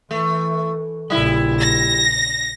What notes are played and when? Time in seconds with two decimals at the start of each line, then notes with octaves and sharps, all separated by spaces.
0.11 E3 A3
1.10 A#1 C#3 G3 E4
1.63 A#6